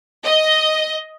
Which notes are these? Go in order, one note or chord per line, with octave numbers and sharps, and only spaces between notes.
D#5